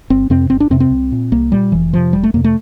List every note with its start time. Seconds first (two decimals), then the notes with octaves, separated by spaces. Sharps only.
0.10 G1 C4
0.30 F2 C3 C4
0.50 G1 C4
0.60 D4
0.70 F2 C3 C4
0.80 C4
0.91 C2
1.12 A#2
1.32 C2 A#3
1.52 A#2 G3
1.72 F1 E3
1.93 F2 C3 F3
2.13 F1 G3
2.23 A3
2.34 F2 C3 A#3
2.44 A3